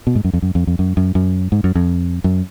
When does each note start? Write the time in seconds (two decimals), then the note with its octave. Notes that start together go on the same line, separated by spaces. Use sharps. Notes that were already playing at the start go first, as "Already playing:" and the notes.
0.07 B2
0.15 G#2
0.25 F#2
0.33 F2
0.42 F#2
0.55 F2
0.67 F2
0.79 F#2
0.97 F#2
1.15 F#2
1.52 G#2
1.64 F#2
1.75 F2
2.24 F#2